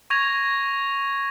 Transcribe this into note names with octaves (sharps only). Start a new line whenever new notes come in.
C#6 G#6 A#6 F7